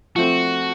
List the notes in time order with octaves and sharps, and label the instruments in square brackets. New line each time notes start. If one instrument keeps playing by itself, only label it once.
[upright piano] F3 A3 C4 [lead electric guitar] F#4